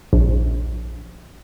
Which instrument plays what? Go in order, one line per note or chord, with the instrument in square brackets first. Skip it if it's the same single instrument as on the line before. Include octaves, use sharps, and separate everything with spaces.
[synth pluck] A#1